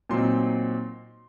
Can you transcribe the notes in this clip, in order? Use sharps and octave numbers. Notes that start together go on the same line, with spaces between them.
A#2 F#3 C4 D#4 C6